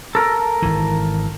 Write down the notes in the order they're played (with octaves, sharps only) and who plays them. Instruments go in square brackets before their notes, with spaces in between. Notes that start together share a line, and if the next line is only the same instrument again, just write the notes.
[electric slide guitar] A4 A#4
[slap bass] G#1 E3